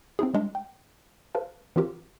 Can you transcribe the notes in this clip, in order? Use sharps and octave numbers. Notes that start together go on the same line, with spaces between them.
C4 D#4 E4 G#4
G3 G#3 D4
G5
A4 B4 C5 F5 A5
E3 C4 F4 G4 A#4